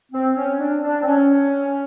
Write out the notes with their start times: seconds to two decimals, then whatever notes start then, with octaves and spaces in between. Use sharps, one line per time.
0.12 C4
0.35 C#4
0.59 D4
0.83 D4
1.02 C4
1.06 C#4